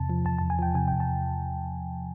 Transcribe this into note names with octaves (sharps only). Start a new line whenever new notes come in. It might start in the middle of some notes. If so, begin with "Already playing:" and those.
Already playing: E2 C3 A5
F3
E2 A5
A5
E2
G#5
F3 G5
C3 G#5
G5
E2
A5